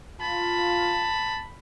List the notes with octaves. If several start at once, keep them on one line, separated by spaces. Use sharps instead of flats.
F4 A5 B5